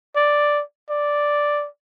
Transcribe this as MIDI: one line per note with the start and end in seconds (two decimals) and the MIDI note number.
0.16 0.62 74
0.90 1.67 74